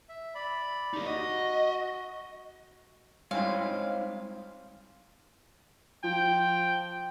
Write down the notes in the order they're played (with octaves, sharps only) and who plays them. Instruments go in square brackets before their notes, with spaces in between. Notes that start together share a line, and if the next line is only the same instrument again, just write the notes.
[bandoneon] E5
D5 B5
[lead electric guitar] D#4 G4
[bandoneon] F#4 [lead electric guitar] D#5
[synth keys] G3 [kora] G#3 C4 E4 [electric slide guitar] D#4 C5 C#5 [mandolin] F5
[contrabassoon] F3 [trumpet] G5